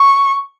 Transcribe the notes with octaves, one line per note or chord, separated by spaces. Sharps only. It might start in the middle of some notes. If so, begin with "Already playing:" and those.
Already playing: C#6